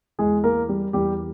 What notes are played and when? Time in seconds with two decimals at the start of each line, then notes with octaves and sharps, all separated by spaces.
0.18 E2 E3 G#3 G#4
0.44 A#3 A#4
0.69 G3 G4
0.93 E2 E3 G3 G4